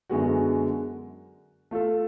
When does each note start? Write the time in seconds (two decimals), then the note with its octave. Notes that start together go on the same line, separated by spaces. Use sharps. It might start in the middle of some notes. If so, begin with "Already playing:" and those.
0.10 F#2 D3 G#3 B3 F#4
1.71 A3 F4 A4